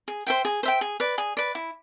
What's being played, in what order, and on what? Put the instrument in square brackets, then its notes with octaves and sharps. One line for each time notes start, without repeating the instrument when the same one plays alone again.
[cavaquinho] G#4
C5 E5 G5
G#4
C5 E5 G5
G#4
B4 D5
G#4
B4 D5
E4